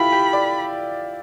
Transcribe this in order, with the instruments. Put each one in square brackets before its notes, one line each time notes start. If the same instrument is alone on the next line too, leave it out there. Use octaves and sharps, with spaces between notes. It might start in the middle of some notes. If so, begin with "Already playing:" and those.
Already playing: [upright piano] E4 F4 G4 [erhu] B5
[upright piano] G4
D5